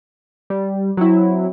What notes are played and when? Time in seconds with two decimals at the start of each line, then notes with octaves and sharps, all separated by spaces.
0.50 G3
0.97 F#3 C4 E4